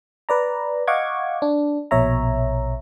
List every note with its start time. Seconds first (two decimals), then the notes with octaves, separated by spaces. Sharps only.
0.29 B4 D5 A#5
0.87 D#5 F5 F#5 C#6 D6 G#6
1.42 D4
1.91 A#1 B2 C#5 E5 A#5